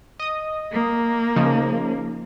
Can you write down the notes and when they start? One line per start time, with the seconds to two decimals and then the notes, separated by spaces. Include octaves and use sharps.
0.19 D#5 D#6
0.71 A#3
1.36 C#3 F3 D#4